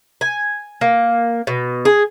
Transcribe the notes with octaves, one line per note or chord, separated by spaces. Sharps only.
G#5
A#3
B2
G#4